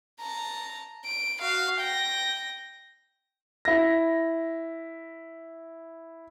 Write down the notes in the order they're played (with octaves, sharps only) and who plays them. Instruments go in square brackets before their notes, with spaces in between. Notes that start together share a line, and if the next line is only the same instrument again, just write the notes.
[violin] A5 A#5
D7
F#4 F5
G5 A#6
[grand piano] E4 A#6